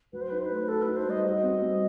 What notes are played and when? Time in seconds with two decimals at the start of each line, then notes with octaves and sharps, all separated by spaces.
0.13 F#3 B4
0.21 C5
0.30 D#4 B4
0.38 C5
0.46 A3 B4
0.68 F#4 A4
0.82 B4
0.88 D#4
0.96 C5
1.06 G3 D#5
1.24 F#4 D#5
1.43 C4
1.62 G3